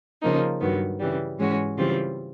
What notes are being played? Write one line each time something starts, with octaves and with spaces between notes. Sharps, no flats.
C#3 F3 A#3 D#4
G2 D#3 F#3 B3
C#3 E3 G3
G#2 E3 G#3 C#4 F#4
C#3 E3 G3 C4 F4